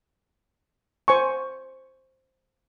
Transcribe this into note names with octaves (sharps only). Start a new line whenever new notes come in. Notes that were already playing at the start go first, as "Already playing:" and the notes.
C5 G#5 C#6